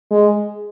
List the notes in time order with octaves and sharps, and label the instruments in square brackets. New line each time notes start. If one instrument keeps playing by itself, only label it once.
[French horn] G#3